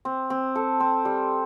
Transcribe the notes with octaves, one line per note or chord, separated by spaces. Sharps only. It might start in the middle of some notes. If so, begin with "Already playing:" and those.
C4
C4
A4
C4
G3